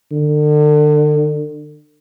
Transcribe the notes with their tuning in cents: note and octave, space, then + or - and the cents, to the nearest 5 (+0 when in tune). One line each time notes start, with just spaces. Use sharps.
D3 +35